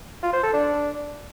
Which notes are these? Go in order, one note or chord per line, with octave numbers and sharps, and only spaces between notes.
F4
C5
A4
D4